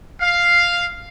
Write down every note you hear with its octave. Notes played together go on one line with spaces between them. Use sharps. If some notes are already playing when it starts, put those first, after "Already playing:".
F5